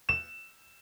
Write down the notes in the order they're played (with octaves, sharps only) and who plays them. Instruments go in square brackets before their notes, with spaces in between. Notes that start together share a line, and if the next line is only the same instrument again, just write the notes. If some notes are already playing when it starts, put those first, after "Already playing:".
[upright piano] E7